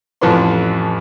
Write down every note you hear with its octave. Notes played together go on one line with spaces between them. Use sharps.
A1 F2 E3 A4 B4 C6